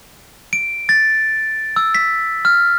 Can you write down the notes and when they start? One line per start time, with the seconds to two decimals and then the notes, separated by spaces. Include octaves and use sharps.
0.53 D7
0.89 A6
1.76 E6
1.95 B6
2.45 F6